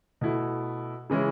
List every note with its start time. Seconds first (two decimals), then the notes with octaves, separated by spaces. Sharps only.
0.21 B2 A3 E4
1.10 C#3 E3 G#3 C#4 E4